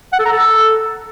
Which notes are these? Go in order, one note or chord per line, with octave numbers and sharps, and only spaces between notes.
F#5
A4
A#5
A4